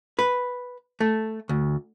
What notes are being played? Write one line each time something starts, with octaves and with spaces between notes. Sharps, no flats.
B4
A3
D2